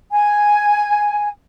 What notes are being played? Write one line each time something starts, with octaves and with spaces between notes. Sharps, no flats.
G#5